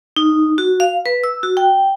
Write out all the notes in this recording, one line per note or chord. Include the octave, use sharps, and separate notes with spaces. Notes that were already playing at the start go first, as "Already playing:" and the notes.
D#4
F#4
F5
B4
E6
F#4
G5